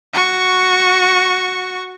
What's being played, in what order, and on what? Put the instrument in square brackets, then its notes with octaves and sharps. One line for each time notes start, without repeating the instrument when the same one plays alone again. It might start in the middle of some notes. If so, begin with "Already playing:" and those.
[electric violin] F#4 C#6